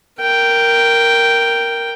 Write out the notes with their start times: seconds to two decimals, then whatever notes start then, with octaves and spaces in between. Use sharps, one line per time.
0.22 A#4 G5